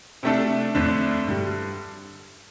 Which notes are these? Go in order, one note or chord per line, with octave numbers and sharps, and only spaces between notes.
C3 A3 D4 A4
F2 D3 A3 D4
G2 D3 G3